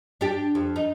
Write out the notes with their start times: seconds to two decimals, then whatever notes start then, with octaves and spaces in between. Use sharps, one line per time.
0.21 D4 G4
0.55 F2
0.76 D#4